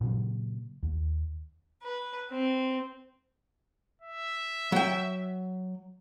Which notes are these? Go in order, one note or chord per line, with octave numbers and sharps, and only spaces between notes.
A#2 C#3 F#3
D#2
B4
C4
E5
F#3 G5